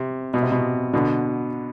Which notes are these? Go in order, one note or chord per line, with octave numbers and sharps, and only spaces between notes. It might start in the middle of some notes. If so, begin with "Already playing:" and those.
Already playing: C3
B2
C3
B2
B2 D3